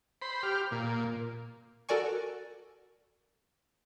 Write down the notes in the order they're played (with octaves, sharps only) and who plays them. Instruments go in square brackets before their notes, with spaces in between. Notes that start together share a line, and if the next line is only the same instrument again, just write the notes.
[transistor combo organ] C5 B5
G4 F6
A#2
[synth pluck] F#4 A4 A#4 D5 G#5 C#6